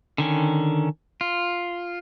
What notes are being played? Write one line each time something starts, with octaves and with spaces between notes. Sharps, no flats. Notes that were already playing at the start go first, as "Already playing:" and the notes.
D3 D#3 C#4
F4